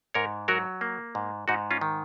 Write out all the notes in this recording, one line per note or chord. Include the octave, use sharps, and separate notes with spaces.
G#2 A#4 C#5
F#3 F#4 A#4
A#3
G#2
G#2 D#4 F#4
C#4 F4
D#3